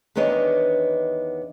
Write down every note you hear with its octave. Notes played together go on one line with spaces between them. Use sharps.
E2 D#3 B3 D4 C#5 D#5